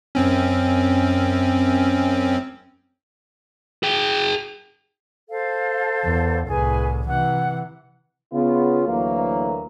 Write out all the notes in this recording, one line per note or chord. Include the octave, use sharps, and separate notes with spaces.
F#2 C4 C#4
G#4 G5
A4 C5 F5
E2
C2 A2 G#4 B4 G#5
C3 E3 F#5
C#3 B3 F4
D2 E3 F#3 A#3